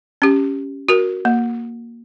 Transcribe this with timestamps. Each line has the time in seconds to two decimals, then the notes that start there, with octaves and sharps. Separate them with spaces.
0.22 C#4 G4
0.89 F#4 A#4
1.25 A#3